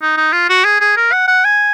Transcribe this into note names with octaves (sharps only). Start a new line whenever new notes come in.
D#4
D#4
F4
F#4
G#4
G#4
A#4
F#5
F#5
G#5